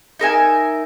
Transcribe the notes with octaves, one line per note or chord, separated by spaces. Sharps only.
D#4 A#4 E5 G#5